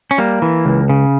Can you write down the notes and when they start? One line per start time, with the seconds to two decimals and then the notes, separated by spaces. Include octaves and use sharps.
0.11 C#4
0.18 G3 A#3
0.42 E3
0.66 C#2
0.89 C#3